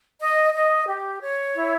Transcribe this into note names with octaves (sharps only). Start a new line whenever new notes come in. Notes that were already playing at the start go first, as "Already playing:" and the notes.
D#5
D#5
G4
C#5
E4